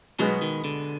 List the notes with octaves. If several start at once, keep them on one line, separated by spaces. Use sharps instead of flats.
B2 F#3 G#3 B3
D#3
D3